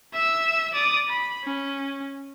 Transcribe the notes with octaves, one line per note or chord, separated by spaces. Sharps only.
E5 E6
D5 D#6
B5
C#4